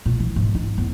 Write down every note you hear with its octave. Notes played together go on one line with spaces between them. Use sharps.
A#2
E3
G#2
D#4
E2